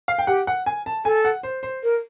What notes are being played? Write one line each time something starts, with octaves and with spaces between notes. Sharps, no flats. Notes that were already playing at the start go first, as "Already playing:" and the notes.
F5
G5
G4 F#5
F#5
G#5
A5
A4 G#5
F#5
C5
C5
A#4